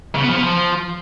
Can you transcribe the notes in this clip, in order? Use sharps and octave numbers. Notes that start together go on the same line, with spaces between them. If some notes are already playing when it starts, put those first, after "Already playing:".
C#3
B3
F3
B3
F3